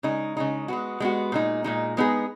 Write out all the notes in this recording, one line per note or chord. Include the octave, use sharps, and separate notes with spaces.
C#3 G#3 D#4
C#3 G#3 D#4
G#3 B3 F#4
G#3 B3 F#4
A#2 G#3 D#4
A#2 G#3 D#4
G#3 B3 D#4 G#4